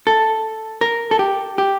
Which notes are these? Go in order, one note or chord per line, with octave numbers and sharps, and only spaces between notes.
A4
A#4
A4
G4
G4